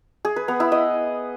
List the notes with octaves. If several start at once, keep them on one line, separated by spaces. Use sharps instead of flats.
G#4
B4
B3
E4
D#5